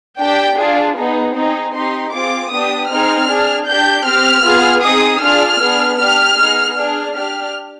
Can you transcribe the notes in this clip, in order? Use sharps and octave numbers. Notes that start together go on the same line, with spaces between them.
D4 G4 G5
D4 F4 G#4
B3 D#4 G#4
C4 D#4 G#4
C4 D#4 G4 C6
C4 F4 G#4 D6
B3 D4 G4 D#6
C4 D#4 G#4 F6
D4 G#4
D4 G4 G6
C4 G4 F6
B3 F4 G#4
C4 D#4 G#4 D#6
D4 F4 G#4 F6
B3 D4 G#4
D4 G4 F6
B3 D#4 G#4
D4 G#4 F6
D4 G4 F6